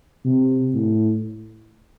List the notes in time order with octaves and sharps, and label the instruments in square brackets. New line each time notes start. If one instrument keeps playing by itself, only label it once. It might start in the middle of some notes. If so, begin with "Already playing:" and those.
[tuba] C3
A2